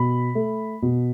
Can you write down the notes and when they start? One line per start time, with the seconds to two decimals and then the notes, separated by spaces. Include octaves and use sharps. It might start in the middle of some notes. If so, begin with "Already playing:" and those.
Already playing: B2 B5
0.35 A3
0.82 B2